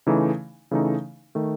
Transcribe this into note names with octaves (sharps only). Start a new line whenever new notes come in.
C#3 E3 A3 D#4
C#3 E3 A3 D#4
D#3 A3